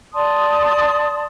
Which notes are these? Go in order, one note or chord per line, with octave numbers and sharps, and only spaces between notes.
D5 A5 C6 D#6